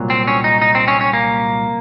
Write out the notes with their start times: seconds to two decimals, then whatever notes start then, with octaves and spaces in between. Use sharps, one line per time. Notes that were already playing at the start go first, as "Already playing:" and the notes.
Already playing: C2 A#2 F#3
0.10 C4
0.27 C#4
0.44 D#4
0.62 D#4
0.75 C4
0.88 C#4
1.01 C#4
1.13 A#3